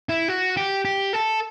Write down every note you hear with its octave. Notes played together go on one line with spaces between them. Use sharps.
E4
F#4
G4
G4
A4